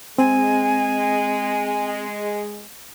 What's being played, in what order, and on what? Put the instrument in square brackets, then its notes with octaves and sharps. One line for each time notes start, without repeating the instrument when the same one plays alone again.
[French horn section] G#3 [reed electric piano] C4 [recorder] G#5